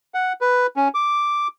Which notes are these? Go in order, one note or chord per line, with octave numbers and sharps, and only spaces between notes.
F#5
B4
C#4
D6